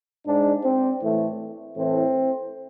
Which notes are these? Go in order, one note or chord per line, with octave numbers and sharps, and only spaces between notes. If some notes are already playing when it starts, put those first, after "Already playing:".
G#2 G#3 D4
C4
A2 E3 A3
A2 E3 A3 C4